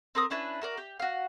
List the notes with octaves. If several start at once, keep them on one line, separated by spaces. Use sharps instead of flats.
C4 A#4 D#6
C#4 D4 E4 B4
F#4 A#4 D5
G4
F#4 F5